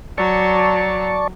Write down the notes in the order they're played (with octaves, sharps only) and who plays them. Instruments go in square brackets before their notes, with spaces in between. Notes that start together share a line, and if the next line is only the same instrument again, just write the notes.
[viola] F#3 [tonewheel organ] D5 A5 C#6